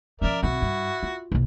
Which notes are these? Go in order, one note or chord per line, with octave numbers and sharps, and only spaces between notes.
F3 C#4 A#4 D5 E5
B1 C4 E4 F#4
G2
F4
F#1 B1